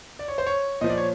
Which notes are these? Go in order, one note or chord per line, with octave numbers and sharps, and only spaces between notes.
D5
C#5
C5
C#5
A#2 F3 D#5
D5
C#5